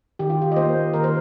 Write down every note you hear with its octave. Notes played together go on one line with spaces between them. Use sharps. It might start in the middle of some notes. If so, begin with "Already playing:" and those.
D#3 G4
F4
G4
D#5
A#3 C5
D#3 A#4
C5